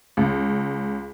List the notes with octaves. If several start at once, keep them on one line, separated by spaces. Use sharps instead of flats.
C#2